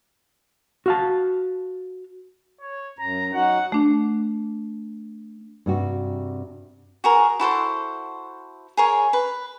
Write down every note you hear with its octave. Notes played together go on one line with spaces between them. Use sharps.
F#4 F5 A5
C#5
F#2 A#5
F#3 D#4 F#4 F#5
A3 D4
G2 C3 F#4
F#4 G#4 A#4
E4 F#4 A4 C5
G#4 A#4 C#5
B4